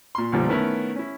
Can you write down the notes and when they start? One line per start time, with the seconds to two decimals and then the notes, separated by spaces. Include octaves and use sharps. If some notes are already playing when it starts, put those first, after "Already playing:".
0.15 A#2 C6
0.32 B1 F#2 A#2 D3 F3 G3
0.48 D#3 A3 B3 C#4 E4 A#4
0.95 C#4 E4